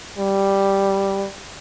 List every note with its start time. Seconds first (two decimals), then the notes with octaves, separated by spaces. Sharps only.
0.18 G3